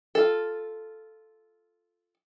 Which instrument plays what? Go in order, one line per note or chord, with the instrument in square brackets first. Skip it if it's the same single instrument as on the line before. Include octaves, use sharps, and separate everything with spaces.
[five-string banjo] F4 A4